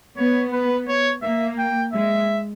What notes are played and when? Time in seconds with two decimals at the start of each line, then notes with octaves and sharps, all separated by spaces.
0.17 B3 C#5
0.52 B4
0.88 C#5
1.23 A#3 E5
1.58 G5
1.93 G#3 E5